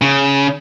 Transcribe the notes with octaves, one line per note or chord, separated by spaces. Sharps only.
C#3